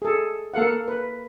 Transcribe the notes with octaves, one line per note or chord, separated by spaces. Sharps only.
G#4 A4
A#3 A4 F5 F#5
B4